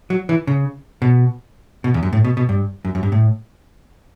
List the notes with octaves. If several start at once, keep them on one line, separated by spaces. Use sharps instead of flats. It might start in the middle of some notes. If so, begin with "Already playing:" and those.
F#3
E3
C#3
B2
B2
E2
F#2
A2
B2
B2
G2
F#2
F#2
G2
A2